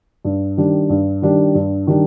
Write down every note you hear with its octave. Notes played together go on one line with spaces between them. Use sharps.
G2
D#3 G3 D4
G2
D#3 G3 D4
G2
D#3 G3 D4